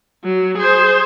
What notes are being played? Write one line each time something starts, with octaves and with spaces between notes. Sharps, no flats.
F#3
G#4 C5